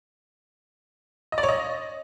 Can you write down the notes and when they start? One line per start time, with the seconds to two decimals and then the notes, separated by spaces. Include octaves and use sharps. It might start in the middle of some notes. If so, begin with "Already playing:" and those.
1.32 D#5
1.38 D5
1.43 C#5
1.49 D#5